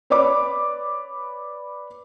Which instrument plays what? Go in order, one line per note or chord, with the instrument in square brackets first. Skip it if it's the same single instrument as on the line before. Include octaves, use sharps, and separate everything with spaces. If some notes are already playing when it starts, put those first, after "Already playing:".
[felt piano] B4 C#5 D5 B5 D6